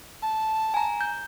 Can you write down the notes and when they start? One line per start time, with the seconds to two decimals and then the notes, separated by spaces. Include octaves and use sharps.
0.22 A5
0.74 G#5 A#5
1.01 G6